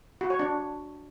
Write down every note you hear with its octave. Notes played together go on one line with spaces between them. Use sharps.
F#4
C#5
D4